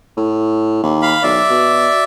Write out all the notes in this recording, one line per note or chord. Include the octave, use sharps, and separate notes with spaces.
A2
D#2
F5 B5
B1 D5 E5
B2